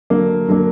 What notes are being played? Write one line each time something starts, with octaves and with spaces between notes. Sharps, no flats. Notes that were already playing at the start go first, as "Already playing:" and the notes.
D3 F#3 A#3
D3 F#3 A#3